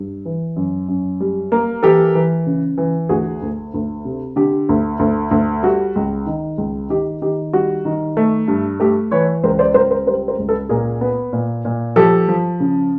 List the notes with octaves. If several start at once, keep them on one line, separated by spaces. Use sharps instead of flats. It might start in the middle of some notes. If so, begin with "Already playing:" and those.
Already playing: G2
E3
F#2
F#2
G3
A#3
E3 G4 A4
E3
C#3
E3
D2 F#4 G#4
D2
D2
C3
D3 G4
D2
D2
D2
G3 F#4
C#2
D#3
C#2
D#3 G4
D#3 G4
G3 F#4
D#3
A3
G2
A3 G4
E3 B4 C#5
C#2 A#4 C5
C5 D5
C#2 A#4 C5
A#4 C5
G3 A#4 C5
A#4 C5
C#2
A4 B4
A#2 G#4 A#4
B3
A#2
A#2
F3 G4 A4
F3
C#3